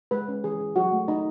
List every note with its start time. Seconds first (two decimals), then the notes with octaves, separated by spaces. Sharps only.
0.11 G#3 B4
0.28 C#4
0.44 E3 G#4
0.60 E3
0.76 F#3 F#4
0.92 A3
1.08 A3 D#4